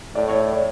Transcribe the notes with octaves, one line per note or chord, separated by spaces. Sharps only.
A2 D5
C#5
C#5
D5